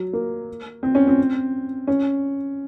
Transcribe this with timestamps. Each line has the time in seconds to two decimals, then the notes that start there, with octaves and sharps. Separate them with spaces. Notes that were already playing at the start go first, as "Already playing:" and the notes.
Already playing: F#3
0.13 A#3
0.83 C4
0.95 C#4
1.07 C4
1.87 C#4